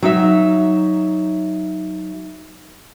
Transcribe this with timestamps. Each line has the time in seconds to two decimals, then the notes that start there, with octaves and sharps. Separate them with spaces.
0.02 F#3 D#4 E5